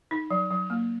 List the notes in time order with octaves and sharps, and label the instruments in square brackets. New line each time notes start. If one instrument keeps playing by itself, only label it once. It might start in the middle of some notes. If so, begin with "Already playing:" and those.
[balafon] D#4
F#3
F#3
A#3